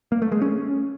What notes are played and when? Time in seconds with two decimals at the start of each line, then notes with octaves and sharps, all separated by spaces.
0.12 A#3
0.22 A3
0.32 G#3
0.42 C#4